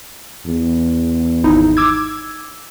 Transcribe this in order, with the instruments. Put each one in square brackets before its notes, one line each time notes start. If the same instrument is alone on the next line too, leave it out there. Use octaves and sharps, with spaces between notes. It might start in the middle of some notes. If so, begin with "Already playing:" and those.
[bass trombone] E2
[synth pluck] G#1 D#4 E4
D6 E6 G#6